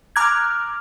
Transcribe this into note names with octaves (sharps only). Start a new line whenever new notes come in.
A#5 D6 F6 F#6 G#6